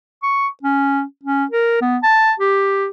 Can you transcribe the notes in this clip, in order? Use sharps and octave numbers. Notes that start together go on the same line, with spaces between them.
C#6
C#4
C#4
A#4
B3
A5
G4